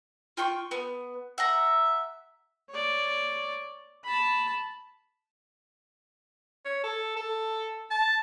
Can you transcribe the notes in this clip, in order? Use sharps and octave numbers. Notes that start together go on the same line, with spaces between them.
F4 G5 C#6
B3
E5 F#5 A#5
C#5 D5
A5 B5
C#5
A4
A4
A5